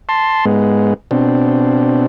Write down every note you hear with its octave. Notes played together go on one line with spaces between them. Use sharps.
A5 C6
G#2 G#3 B3
B2 C4 D4